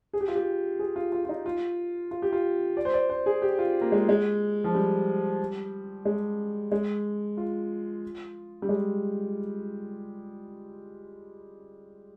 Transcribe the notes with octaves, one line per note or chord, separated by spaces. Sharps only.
G#4
G4
F4
G4
G#4
F4
F4
F4
D#4
F4
F4
G4
F4
D5
C5
D5
C5
G#4
G4
F4
A#3
G#3
G#3
F3
G3
G#3
G#3
F4
G3
G#3